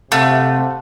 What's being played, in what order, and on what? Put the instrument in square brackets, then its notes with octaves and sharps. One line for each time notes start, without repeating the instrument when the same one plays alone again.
[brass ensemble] C3 [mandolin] A3 [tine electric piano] F5 F#5 A5